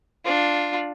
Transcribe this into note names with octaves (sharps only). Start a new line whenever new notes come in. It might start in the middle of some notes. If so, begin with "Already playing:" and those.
D4 F4